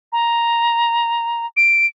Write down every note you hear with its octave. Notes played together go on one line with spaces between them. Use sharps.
A#5
D7